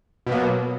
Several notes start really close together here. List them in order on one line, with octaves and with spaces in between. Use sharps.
B2 B3 A#3 F#3